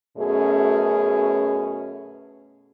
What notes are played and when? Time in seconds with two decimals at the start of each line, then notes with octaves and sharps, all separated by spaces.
0.18 F#2 B2 A3 C#4 G#4